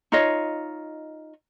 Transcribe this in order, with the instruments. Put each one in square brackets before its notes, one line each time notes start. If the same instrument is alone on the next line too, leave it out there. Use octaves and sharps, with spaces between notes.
[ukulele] D#4 F4 C#5 D#5